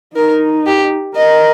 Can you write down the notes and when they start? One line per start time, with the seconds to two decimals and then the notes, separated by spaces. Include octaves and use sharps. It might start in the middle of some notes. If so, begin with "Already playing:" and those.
0.16 D#4 A#4
0.66 G4
1.16 A#4 D#5